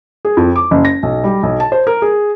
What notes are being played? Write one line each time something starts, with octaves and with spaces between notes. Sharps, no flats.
G#4
F2
D6
F#1
A#6
B1
G3
B1
A5
C5
A#4
G#4